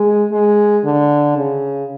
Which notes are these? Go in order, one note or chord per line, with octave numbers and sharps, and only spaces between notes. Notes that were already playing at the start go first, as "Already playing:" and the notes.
Already playing: G#3
G#3
D3
C#3